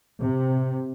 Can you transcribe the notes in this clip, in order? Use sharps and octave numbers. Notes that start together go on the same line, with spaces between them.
C3